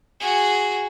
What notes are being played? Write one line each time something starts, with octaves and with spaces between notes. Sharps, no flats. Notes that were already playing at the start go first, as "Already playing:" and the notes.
F#4 G#4